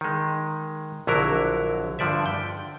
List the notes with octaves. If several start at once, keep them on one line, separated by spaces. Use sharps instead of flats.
D#3 G#3
A#1 D3 F#3 E4 A#4
G2 D3 F3 D5 E5
G5